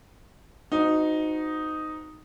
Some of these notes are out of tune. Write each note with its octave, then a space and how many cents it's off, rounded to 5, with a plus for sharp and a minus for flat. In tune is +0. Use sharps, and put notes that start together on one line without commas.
C4 -30 D#4 +0 F#4 -20